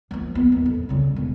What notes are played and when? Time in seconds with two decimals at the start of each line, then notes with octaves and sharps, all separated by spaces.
0.11 F3 A#3
0.35 B3
0.52 D#2
0.66 F2
0.89 C#3 G3
1.16 E1